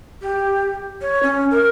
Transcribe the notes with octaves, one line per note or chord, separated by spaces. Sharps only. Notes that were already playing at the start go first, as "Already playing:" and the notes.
G4
C#5
C#4
A#4